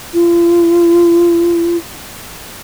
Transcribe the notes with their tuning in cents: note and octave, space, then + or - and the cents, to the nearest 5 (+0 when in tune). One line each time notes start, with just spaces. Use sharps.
F4 -35